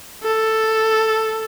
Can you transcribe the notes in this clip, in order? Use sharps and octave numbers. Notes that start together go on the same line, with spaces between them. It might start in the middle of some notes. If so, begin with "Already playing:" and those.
A4